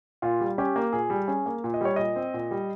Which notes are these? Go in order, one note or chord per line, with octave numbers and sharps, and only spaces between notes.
A#2 F4
G3
C#4 G4
A#3
A#2 G#4
G3
C#4 G#4
A#3
A#2
D#5
G3 C#5
A#2 D#5
C4
A#2
G3